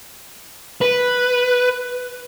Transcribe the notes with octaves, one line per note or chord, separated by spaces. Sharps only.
B4